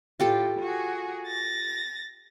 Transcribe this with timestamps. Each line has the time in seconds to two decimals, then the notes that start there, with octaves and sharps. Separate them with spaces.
0.20 A2 F4 G4 A4
0.59 F#4 G#4
1.26 A6 A#6